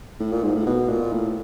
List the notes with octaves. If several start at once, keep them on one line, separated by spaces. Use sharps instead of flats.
A2
A#2
G#2
A2
B2
A#2
A2